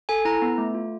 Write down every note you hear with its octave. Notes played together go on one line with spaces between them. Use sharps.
A4 G#5
E4 A#5
B3
A3
F4